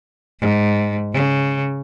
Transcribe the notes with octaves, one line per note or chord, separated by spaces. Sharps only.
G#2
C#3